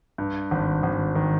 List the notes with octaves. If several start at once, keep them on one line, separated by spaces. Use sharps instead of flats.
G2
G#1
G#1
D#3